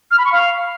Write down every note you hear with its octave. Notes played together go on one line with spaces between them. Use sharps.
F6
B5
C#6
F5